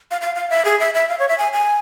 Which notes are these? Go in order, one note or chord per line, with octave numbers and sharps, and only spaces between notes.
F5
F5
F5
E5
G#4
E5
E5
F5
C#5
E5
G#5
G#5